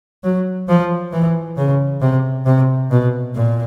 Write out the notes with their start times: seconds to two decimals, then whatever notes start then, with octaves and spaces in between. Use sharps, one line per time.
0.24 F#3
0.68 F3
1.12 E3
1.57 C#3
2.01 C3
2.46 C3
2.91 B2
3.35 A#2